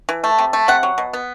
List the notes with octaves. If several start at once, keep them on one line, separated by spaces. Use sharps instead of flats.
E3
A3
C3
A3
C3 F#5
F#3
B2
B3